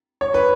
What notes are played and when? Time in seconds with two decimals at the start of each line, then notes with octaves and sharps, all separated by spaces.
0.21 C#5
0.34 B4